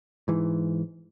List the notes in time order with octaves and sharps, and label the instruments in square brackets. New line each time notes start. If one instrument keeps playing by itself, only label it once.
[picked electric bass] G#2 E3